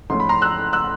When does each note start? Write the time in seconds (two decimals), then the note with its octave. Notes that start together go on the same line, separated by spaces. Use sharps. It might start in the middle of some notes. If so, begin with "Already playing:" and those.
0.10 A1 G#2 F3 A3 C#4 C6
0.20 B5
0.29 A#5 C6
0.42 E6 F#6
0.73 E6 F#6